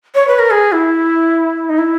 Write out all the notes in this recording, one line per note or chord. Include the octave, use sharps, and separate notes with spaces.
C#5
B4
A#4
G#4
E4
D#4
E4